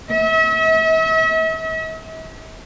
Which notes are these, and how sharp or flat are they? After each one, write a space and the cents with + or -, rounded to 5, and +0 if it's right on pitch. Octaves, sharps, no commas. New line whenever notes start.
E5 -40